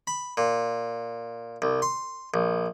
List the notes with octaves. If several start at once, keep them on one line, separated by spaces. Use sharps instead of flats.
B5
A#2
C2
C6
A#1